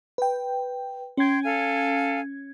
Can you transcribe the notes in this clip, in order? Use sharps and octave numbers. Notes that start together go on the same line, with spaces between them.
B4 G5
C#4 G5 C6 G#6
A4 F5 G#5